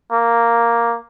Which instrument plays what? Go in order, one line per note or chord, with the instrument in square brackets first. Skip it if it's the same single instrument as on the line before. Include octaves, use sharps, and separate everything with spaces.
[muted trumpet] A#3